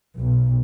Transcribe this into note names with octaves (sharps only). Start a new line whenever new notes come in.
B1